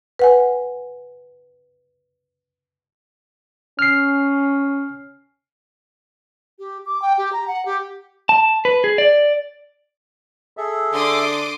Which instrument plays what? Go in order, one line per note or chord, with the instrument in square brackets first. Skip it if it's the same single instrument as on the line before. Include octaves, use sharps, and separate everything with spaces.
[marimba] B4 F#5 G#5
[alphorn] C#4 [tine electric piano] F6 C7
[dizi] G4
D6
G5
G4
A#5
F#5
G4
[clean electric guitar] A5
B4
G#4
D5
[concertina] G#4 A4 E5
[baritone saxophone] D3 [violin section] C6 D6 D#6